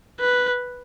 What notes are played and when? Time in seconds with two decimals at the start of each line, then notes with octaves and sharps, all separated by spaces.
0.20 B4